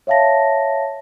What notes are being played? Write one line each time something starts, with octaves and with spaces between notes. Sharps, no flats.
C#5 E5 F5 A5 A#6